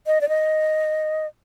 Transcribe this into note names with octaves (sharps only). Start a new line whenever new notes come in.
D#5
D5
D#5